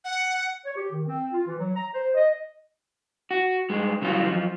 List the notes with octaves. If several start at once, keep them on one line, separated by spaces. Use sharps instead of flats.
F#5
C#5
G4
D#3
C4
F4
E3
F#3
A#5
C5
D#5
F#4
G2 G#3
C#3 E3 F#3 G3 F4
F#2 F3